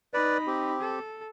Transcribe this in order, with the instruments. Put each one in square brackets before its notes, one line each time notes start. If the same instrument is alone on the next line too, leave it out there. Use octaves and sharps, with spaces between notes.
[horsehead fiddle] D#4 B5 [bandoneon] B4 D5
[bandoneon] C4 G4
[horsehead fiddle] A4